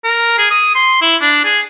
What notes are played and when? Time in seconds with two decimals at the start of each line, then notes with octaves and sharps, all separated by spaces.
0.04 A#4
0.38 G#4
0.51 D#6
0.75 C6
1.02 E4
1.21 D4
1.44 G#4